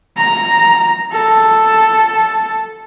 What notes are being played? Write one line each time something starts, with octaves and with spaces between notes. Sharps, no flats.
A#5
A4